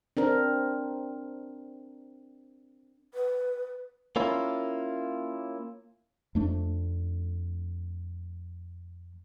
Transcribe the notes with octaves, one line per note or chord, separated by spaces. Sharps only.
C4 D4 A#4
B4
A#3 C#4 E4 F4
F2 A3 D4